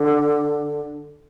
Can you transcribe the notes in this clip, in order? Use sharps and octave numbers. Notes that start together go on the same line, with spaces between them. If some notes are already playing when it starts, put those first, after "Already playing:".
Already playing: D3